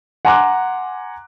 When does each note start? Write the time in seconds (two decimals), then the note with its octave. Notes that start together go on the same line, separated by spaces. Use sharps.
0.25 F#5 G#5 A#5 C6 D6 F#6